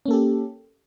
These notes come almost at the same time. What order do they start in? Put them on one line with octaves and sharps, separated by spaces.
C#4 A#3 A4 G4